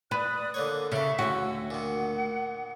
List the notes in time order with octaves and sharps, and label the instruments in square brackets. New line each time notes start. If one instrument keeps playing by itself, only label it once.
[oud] B4 [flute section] D5 D#6 F#6
[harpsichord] D3 A#3 C#5
[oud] C#3 [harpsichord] E4 A4 [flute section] E5
[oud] D2 F#4 [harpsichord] C#4 [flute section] E6
[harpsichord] A#2 D#3 [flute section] F#5